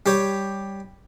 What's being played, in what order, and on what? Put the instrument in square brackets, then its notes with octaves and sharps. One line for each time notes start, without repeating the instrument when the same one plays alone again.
[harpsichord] G3 G4 C#5